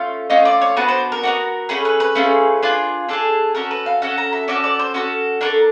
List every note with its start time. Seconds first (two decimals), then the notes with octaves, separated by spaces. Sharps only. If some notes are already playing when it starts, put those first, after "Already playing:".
Already playing: A3 C#4 F4
0.30 A3 C#4 F4 D#5
0.45 D5
0.62 C#5
0.76 B3 D4 F#4 B4
0.88 C5
1.12 A#4
1.23 B3 D4 F#4
1.69 A3 C#4 G#4 B4
1.85 B4
2.00 B4
2.15 A3 C#4 F4 G#4
2.63 D4 F4 G#4
3.08 D4 F4 G#4 A4
3.55 C#4 F#4 A4 A#4
3.71 B4
3.86 F5
4.02 C#4 F#4 A4 F#5
4.18 A#5
4.33 E5
4.48 C#4 F#4 A4 D5
4.64 D5
4.79 C5
4.94 C#4 F#4 A4 C5
5.41 D4 F#4 A4 A#4